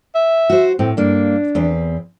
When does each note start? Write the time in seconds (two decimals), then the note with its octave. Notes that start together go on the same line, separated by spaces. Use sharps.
0.15 E5
0.50 F#4 C5
0.79 A2 C4
0.97 G2 A#3 D4
1.55 E2 C4 B4